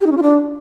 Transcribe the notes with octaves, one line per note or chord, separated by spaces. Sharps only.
G4
D#4
C#4
F4
D4